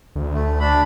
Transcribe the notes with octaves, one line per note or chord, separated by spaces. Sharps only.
D2
A3
D4 B5